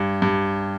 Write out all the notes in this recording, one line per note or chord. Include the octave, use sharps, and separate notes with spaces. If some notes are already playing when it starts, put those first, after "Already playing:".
Already playing: G2
G2